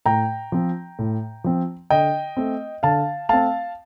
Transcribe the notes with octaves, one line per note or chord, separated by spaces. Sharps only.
A2 G5 A#5
F3 C4
A2
F3 C4
D3 D#5 G5
A3 C4
D3 F5 A5
A3 C4 F5 A5